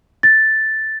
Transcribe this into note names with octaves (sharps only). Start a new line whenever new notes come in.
A6